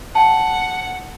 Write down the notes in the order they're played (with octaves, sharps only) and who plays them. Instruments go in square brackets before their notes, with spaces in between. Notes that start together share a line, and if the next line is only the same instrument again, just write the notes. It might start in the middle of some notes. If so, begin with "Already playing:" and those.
[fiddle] F#5 [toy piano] G5 A5